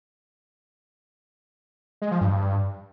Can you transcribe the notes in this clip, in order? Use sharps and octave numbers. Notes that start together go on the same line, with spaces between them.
G#3
F3
G2